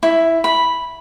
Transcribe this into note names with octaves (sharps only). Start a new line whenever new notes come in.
E4
B5